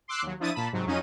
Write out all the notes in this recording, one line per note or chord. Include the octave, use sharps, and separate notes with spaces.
C6 D6 E6 F#6 C7
D#2 F#3
F3 D4 E4 D#6 A6 D#7
A#2 A5 B5
G#2 C3 F#3
F2 F#3 C#4 D#4 F4 D#7